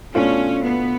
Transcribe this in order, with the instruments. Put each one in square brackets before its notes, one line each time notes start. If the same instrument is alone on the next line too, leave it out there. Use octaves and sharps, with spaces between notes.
[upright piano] B2 A3 D4 F4 [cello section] C#4
[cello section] B3